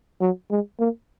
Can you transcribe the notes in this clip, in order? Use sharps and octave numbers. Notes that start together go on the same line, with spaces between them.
F#3
G#3
A#3